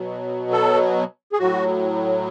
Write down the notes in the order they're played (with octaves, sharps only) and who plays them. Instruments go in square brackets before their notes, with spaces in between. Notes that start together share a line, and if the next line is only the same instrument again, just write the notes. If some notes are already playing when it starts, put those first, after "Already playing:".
Already playing: [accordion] B2 F#3
A4
G#4
A2 F#3 F#4